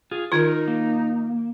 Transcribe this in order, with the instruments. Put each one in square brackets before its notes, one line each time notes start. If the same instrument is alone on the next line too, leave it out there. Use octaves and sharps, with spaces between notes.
[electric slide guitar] F4 G#4
[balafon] D#3 F4 [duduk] D#4 [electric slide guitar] A#4
[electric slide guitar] A#3